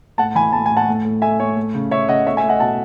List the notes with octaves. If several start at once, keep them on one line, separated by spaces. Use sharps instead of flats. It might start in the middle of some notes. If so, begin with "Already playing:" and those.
A2 F#5 A5
E3 G#5 B5
A2 A5
G#5
A2
F#5 A5
A2
A2
A3 E5 G#5
A2 C#5
A3
C#3
C#3 C#5 E5
C#3 D#5 F#5
A3 C#5 E5
E5 G#5
A3
D#5 F#5
B2 F#5 A5